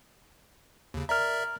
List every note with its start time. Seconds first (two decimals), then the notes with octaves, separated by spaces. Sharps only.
0.94 D#2 C#3
1.09 A#4 D5 E5 A#5 F6